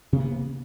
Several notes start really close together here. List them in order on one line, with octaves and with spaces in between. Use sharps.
C3 A#3 B3